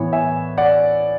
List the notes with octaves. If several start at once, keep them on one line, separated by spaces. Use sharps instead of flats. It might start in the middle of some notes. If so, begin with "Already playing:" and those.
Already playing: A2 E3 B3 C#5
E5 G#5
D5 F#5